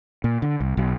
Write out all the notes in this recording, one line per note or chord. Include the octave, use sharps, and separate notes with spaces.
A#2
D3
C2
B1